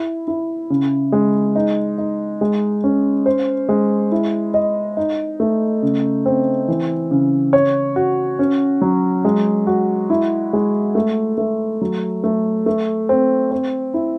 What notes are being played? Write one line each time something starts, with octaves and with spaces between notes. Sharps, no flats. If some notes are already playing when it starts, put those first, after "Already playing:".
Already playing: E4
E4
C#3
G#3
D#4
D#4
G#3
C#4
C5
G#3
E4
D#5
D#4
A3
C#3
C4
E3
C#3
C#5
F#4
C#4
F#3
G#3
F#4
E4
G#3
A3
A3
F#3
A3
A3
C4
C4
E4